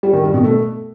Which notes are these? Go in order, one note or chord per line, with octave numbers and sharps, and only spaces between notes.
G3
D#3
G2
B2
A3